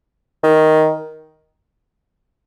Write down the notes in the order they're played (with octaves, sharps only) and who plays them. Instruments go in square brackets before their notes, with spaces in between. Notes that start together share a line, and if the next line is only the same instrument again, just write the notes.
[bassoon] D#3